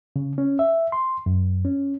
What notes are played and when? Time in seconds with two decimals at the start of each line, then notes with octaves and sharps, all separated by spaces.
0.16 C#3
0.38 C#4
0.59 E5
0.92 C6
1.26 F#2
1.65 C#4